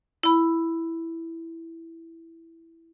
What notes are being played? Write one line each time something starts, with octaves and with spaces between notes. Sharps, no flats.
E4 B5